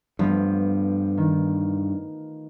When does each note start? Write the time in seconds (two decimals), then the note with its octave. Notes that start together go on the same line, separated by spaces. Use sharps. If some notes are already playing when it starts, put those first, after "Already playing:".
0.19 G2 F3 A3 B3
1.18 D#3